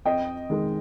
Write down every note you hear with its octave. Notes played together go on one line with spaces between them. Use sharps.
F2 D#5 G5
D#3 G#3